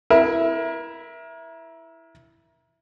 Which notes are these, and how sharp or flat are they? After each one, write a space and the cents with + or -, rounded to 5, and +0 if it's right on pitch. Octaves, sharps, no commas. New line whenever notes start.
E4 +0 A#4 +30 E5 +0